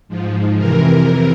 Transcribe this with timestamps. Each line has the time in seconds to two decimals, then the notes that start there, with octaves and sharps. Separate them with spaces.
0.09 G#2 F3
0.58 F2 C3 E3 A#4